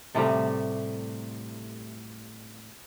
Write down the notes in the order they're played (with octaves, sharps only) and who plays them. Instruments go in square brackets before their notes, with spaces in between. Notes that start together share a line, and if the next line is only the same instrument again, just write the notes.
[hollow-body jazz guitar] A2 C3 G3 A3